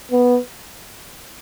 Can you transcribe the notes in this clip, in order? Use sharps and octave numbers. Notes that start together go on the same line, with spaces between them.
B3